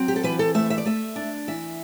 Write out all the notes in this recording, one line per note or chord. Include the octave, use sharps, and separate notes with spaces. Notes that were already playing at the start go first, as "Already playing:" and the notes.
Already playing: F#3 C4
G4
A4
E3 B4
A4
A3 E5
E5
D5
A3 E5
D4
E3 E5